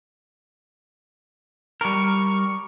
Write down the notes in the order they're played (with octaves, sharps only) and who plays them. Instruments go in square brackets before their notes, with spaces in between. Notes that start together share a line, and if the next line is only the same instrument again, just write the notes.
[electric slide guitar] G3 A#4 [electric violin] C#6